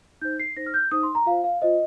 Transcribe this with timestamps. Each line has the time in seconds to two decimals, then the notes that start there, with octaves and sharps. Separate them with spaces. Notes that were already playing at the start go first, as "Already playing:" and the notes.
0.22 D#4 C5 G6
0.39 C7
0.57 D#4 C5 A#6
0.66 F6
0.74 G6
0.91 D#4 C5 D#6
1.03 C6
1.15 A#5
1.26 F4 C5 F5
1.44 F5
1.61 F4 C5 D#5